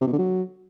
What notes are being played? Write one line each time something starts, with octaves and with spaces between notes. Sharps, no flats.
C3
B2
D3
F#3